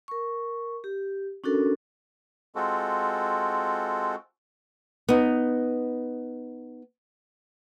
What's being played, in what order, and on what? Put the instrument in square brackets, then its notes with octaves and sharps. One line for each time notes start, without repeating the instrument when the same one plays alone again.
[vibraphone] A#4 C#6
G4
C#4 D4 F#4 A4 A#4
[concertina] G#3 C4 F4 F#4 A4
[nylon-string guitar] B3 D#4